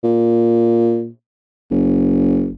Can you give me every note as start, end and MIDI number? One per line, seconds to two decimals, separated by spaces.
0.04 1.09 46
1.71 2.52 30